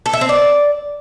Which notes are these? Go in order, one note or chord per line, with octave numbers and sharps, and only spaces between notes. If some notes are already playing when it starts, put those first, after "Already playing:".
A4
E5
C4
D5